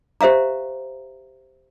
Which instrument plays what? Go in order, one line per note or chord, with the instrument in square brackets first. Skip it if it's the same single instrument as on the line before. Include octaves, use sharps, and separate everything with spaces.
[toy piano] G4 C5 E5 F5 A#5